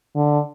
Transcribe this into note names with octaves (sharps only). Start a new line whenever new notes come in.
D3